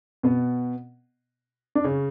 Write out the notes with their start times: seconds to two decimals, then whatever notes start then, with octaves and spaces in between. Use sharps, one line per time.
0.23 B2 B3
1.75 D4
1.84 C#3 C#4